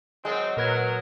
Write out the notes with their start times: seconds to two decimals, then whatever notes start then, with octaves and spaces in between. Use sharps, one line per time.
0.25 D#3 F#3 G#3 C4
0.57 A#2 F#3 A#4 B4 G#6